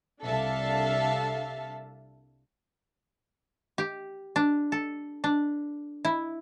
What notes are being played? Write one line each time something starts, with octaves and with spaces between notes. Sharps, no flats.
C2 D4 A4 E5 F5 A5
G4
D4
A4
D4
E4